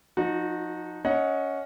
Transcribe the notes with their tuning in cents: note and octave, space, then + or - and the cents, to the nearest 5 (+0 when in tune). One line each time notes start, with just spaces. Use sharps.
F3 +20 D#4 +0 F#4 -25
C#4 +10 D#5 +25 F#5 -10